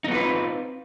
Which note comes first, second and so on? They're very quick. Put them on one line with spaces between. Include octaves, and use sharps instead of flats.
D#4 B3 F4 B4 C4